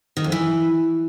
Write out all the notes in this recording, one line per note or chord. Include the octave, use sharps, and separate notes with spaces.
D#3
F2
E3